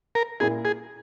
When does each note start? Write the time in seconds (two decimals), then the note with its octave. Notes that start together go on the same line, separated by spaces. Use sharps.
0.15 A#4
0.40 A#2 A#3 E4 G#4
0.65 G#4